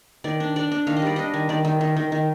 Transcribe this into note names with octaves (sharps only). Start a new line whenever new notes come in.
D#3 D5
D4
D4 D5
D4
D#3 F5
D#5
G3 D5
D4 D#5
D#3
D#3 D5
D#3
D#3
D#3
D#3